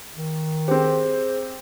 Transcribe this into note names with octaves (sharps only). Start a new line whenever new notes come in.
D#3
C4 G4 G#4 C5